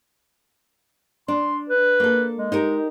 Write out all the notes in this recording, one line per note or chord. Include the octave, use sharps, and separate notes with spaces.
D4 C6
B4
A#3 A4
G#3
D#4 G4 A#4